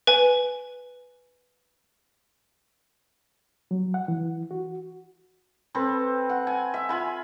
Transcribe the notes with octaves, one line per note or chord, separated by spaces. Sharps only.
B4 G#5
F#3
F#5
E3
F#4
C4 A4 B4
F#5
G#5
E5
F4 G#5 B5